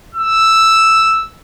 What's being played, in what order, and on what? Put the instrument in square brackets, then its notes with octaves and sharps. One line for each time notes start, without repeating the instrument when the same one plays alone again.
[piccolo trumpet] E6